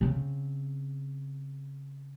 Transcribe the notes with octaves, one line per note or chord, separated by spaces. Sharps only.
C#3 C4